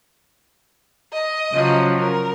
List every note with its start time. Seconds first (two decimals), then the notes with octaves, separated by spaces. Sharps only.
1.13 D#5
1.50 C#3 F3 F#3
1.98 A#4